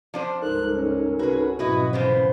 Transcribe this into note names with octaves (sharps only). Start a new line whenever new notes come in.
F3 D4 C5
C#2 G2 G#3 D#4 A4 A#4 F#6
C#4
C2 C#4 F#4 G#4 B4
B1 F2 G#2 C#4 E4 F#4 B4 D#5
C#3 E3 B3 C5